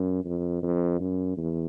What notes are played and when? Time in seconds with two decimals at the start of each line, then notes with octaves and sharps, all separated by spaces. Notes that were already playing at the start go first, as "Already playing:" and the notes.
Already playing: F#2
0.25 F2
0.63 F2
1.00 F#2
1.37 E2